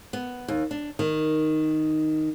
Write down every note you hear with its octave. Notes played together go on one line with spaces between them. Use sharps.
B3
D#2
D4
D#3